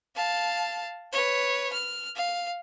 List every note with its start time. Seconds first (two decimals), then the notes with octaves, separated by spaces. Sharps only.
0.16 F5 A5
1.12 B4 C#5
1.73 F6
2.16 F5